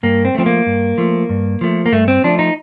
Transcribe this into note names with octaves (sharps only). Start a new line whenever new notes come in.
G2 A#3
C4
F3 A3 C4
A#3
G2
F3 A3
G2
F3 A3
A#3
G2 A3
C4
F3 A3 D4
D#4